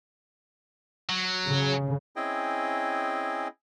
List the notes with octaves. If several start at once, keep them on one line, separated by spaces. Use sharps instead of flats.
F#3
C#3
C4 C#4 E4 G#4 D#5 G5